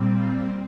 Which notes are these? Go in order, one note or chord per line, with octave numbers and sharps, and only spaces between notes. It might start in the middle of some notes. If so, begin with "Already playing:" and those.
Already playing: A#2 G3 C4
F4